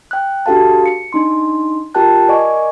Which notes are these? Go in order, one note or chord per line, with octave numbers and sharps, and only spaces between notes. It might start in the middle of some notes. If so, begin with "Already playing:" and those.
G5 F#6
D4 F#4 G4 A4 F5 A5
C#7
D4 D#4 C6
F4 G4 A#4 G5 A5 F#6
A#4 D5 D#5 G#5 C#6